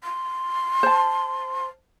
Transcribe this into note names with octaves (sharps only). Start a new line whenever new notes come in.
C6
C5 A5